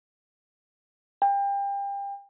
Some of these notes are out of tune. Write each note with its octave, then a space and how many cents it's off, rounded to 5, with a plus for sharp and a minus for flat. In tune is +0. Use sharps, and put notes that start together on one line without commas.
G5 +30